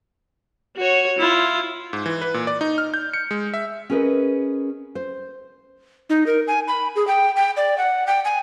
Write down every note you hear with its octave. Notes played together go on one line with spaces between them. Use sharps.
F#4 C#5
E4 F4
G#2
E3
B4
A#2
D5
D#4
F6
G6
C#7
G#3
E5
C#4 G#4 A#4 B4 D#5
C5
D#4
A#4
G#5
B5
G#4
G5
G5
D5
F#5
G5
G#5